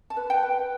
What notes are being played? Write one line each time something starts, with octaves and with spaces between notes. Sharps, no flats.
A5
B4
G5
B4